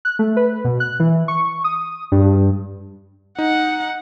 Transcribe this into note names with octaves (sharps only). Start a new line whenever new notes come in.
F#6
A3
B4
B2
F#6
E3
C#6
D#6
G2
D#4 F#5